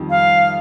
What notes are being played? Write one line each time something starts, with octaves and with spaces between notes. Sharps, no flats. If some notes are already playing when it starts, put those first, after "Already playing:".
Already playing: F2 D#3 G3
F5